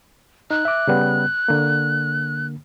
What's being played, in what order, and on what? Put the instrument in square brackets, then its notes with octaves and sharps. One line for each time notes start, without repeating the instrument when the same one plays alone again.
[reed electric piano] D#4 [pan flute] F#6
[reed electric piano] E5 D6
C#3 G3 B3
D3 A#3